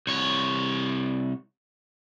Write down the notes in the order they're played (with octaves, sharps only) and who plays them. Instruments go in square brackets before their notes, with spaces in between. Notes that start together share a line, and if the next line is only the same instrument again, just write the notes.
[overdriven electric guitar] C2 C#5